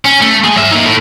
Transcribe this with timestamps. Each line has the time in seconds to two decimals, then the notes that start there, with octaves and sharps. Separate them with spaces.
0.05 C#4
0.21 A3
0.44 G#3 G#5
0.56 F#3 E5
0.71 A#3 D#4
0.85 A2